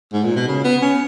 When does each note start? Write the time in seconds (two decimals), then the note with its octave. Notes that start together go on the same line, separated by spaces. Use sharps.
0.13 G#2
0.24 A#2
0.36 B2
0.48 C#3
0.64 B3
0.82 C#4